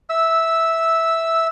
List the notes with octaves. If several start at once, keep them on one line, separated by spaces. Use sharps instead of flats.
E5 E6